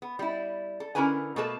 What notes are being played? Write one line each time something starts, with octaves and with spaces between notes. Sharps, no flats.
B3
G3 E4
A4
D3 C#4 E4 A#4 B4 G#5
B2 A3 A#3 A4 B4 A5